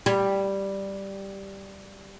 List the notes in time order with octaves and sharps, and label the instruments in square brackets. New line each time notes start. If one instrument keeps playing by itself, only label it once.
[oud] G3